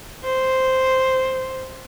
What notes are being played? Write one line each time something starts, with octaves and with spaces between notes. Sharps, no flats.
C5